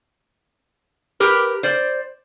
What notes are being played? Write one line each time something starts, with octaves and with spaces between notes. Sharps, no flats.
G4 A#4 B4
C5 D5